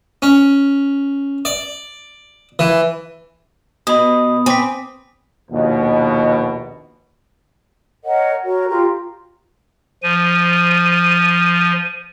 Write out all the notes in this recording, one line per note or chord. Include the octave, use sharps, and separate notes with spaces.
C#4
D5
E3
B2 B5 D#6
C4 G#5 D6 B6
A#1 D#2 B2
A#4 C#5 D#5 F#5
F#4 A#4 C#5
F4 G4 A#4
F3 D#7